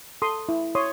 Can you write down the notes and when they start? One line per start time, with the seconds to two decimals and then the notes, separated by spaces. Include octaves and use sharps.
0.22 A4 C6 D#6
0.49 E4
0.75 C#5 C6 D#6